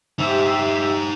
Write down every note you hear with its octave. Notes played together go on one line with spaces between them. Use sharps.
D#4 G4 C5 E5